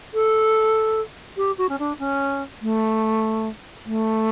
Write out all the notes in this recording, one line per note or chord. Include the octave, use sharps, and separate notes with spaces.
A4
G4
F#4
C#4
D4
C#4
A3
A3